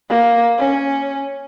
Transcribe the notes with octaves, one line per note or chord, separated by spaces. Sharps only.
A#3
C#4